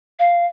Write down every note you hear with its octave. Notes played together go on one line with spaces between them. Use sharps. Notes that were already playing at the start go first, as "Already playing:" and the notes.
F5